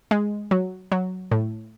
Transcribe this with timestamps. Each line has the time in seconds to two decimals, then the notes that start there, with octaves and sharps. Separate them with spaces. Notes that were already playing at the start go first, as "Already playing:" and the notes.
0.11 G#3
0.51 F#3
0.92 F#3
1.32 A2